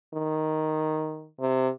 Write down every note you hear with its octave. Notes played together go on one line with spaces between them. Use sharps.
D#3
C3